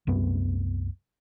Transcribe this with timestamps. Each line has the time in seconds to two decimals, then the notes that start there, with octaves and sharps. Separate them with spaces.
0.07 C2 F#2 A3 B3